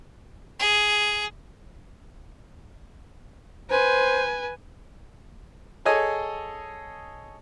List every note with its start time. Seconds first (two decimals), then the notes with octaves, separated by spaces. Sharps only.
0.59 G#4
3.70 B4 C5 G#5
5.85 G#4 A4 C#5 D#5 G#5